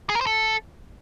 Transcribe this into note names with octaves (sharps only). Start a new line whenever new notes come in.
G#4
A#4
C5
A4